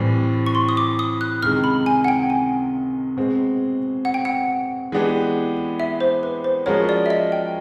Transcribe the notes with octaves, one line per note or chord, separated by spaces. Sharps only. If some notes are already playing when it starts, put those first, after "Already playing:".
Already playing: A2 E3 G3 C4
C#6
C6
D#6
D6
D#6
F#6
C#2 C3 D#3 G#3 F6
B5
G#5
F#5
G5
G#5
B2 G#3 C4
F#5
G5
F#5
E3 G#3 B3 D4 G4
E5
C5
B4
C5
F3 G#3 C#4 F#4 A#4 C#5
D5
E5
D#5
G5